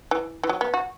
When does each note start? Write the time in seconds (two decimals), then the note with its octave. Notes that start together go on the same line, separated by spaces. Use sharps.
0.11 E3
0.44 E3
0.49 F#3
0.61 B3
0.74 F#4